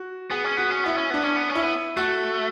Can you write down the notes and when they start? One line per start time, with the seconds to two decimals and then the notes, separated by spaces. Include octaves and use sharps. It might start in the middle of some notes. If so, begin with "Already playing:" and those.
Already playing: F#4
0.30 B3 G#4
0.44 C#4
0.57 B3 F#4
0.70 C#4
0.84 B3 E4
0.97 C#4
1.10 B3 D4
1.23 C#4
1.36 B3
1.50 C#4
1.55 E4
1.63 B3
1.97 A3 F#4